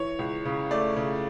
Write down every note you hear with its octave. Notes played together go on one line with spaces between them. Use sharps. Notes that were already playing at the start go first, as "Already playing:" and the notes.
Already playing: E3 C#5
C#2
C#3
A3 D5
C#3